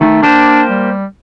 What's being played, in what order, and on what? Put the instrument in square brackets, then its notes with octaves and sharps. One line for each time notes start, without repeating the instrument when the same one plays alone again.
[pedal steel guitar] D#3 [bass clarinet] A3
[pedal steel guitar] A#3 G4 C5 [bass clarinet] D4
[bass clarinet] G3